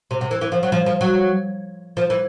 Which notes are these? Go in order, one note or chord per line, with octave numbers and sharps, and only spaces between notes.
C3
C3
E3
E3
F3
F#3
F3
F3
F#3
F3
E3